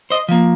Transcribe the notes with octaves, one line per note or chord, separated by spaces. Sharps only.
C5 D#5
F3 A#3